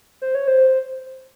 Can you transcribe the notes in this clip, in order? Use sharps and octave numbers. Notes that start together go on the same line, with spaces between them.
C5
C#5
C5